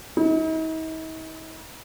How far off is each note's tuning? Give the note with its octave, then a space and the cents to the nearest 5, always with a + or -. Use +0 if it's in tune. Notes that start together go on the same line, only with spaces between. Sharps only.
D#4 +45